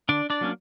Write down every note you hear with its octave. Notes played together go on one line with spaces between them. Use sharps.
D3 D4 D5
D4 D5
F#3 A#3 C#4